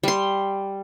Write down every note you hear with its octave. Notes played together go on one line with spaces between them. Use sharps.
G3 C6